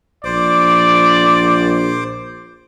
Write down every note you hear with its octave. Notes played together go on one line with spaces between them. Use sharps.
A#1 C5 D5 D6